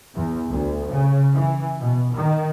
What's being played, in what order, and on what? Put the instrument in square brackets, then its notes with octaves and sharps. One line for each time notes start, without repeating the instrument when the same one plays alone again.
[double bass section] E2
D2
C#3
E3
B2
D#3